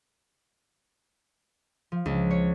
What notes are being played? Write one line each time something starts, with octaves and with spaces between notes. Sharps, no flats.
F3
C#2
C#5